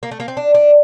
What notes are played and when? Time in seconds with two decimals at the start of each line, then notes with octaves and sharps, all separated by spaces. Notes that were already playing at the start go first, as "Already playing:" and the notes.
0.03 A#3
0.11 A3
0.20 A#3
0.28 C4
0.37 D4
0.55 D4